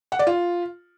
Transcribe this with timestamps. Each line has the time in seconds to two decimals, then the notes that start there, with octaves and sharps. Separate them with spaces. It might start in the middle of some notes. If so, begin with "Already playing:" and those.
0.12 F#5
0.19 D5
0.27 F4